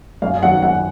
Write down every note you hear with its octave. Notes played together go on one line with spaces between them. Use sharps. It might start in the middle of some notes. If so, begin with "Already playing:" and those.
F#2 F5
D#3 F#3 F#5
F#2 F#5